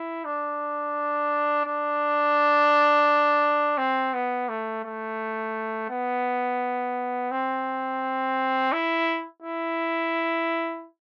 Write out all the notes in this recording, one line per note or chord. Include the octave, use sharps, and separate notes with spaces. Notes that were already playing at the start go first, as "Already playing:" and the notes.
Already playing: E4
D4
D4
C4
B3
A3
A3
B3
C4
E4
E4